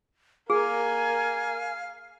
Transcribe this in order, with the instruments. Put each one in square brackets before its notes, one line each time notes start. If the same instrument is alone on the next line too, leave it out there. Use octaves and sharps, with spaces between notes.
[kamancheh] A#3 A#4 [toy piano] G#4 [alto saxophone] F5 [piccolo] G#5